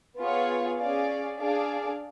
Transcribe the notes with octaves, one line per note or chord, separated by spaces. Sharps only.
B3 F4 G#4 C#5 F5
C#4 G#4 D5 F5
D4 G#4 D5 F5